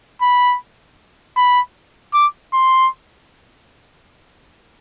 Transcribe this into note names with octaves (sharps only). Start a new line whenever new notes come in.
B5
B5
D6
C6